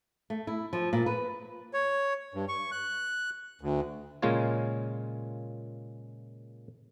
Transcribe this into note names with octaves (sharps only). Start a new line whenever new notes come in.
A3
E4
F3
A#2
B4
C#5
G2
C#6
F#6
D2
A#2 C#3 G#3 A#3 F4 C#5